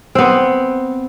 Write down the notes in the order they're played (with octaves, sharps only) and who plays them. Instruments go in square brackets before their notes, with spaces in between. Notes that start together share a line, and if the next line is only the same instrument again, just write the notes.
[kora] B3 C4